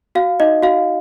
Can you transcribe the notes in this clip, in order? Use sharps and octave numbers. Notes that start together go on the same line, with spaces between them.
F#4 F5
D#4 D#5
F#4 F5